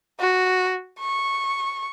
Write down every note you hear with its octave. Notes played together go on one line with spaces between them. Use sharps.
F#4
C#6